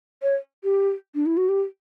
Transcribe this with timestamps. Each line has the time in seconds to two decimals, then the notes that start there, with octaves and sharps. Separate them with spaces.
0.22 C#5
0.64 G4
1.15 D4
1.26 E4
1.37 F#4
1.49 G4